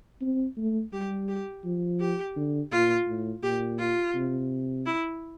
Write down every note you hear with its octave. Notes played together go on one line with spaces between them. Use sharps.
C4
A3
G3 G4
G4
F3
G4
D3
A#2 F4
A2
A#2 G4
F4
C3
E4